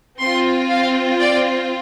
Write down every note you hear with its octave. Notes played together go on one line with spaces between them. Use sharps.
C4 F4 C6
F5
D5